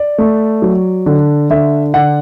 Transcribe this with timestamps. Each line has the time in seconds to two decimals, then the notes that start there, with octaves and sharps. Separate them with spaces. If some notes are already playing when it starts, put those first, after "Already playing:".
Already playing: D5
0.18 A3
0.62 F#3
1.06 D3
1.50 D3 E5
1.94 D3 F#5